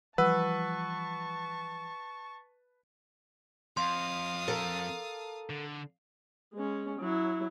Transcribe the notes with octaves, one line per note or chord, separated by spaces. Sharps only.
E3 F3 G3 B4 F#5 A5 C#6 E6
F2 F5 C6 D#6
A4 A#4
D3
G#3 C#4
F#3 E4